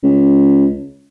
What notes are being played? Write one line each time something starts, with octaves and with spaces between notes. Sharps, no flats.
C#2